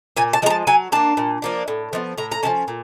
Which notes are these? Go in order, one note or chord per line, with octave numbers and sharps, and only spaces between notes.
A#2 G#5
A5
F3 G#3 A#5
A5
F#3 G#5
A#3 D4 A5
A#2
F3 A#3 D4
A2
F3 G#3 B3
A2 A#5
A#5
F3 G#3 C#4 A5
A#2